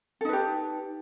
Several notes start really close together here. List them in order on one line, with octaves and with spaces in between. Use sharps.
A4 D#4 B4 G4